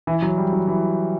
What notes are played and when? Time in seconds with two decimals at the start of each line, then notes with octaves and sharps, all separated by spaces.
0.07 E3
0.22 F#3
0.37 G3
0.53 F#3
0.68 E3